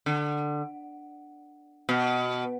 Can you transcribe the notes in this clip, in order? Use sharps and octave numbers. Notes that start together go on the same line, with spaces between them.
D3
B2